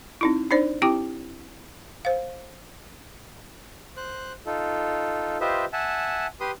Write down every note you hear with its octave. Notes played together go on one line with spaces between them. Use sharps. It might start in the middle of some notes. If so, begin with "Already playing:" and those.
C4 D#4 E4
D4 D#4 C5 D5
C4 E4 G4 G5 D6
C5 F5
C5 F#6
D#4 F4 A4
F4 G4 B4 C5 D#5 E5
E5 F#5 G#5 A5
G4 B4 C6 D#6